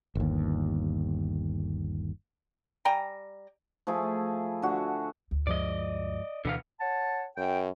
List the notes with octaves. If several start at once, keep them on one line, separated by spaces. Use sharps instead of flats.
G1 D#2
G3 G5 G#5 A#5
F3 A3 E4 G#4
D3 F#4
D2
G2 F3 G#3 D5 D#5
D2 B2 D3 E3 B3 F5
C#5 F#5 A5
F#2 G5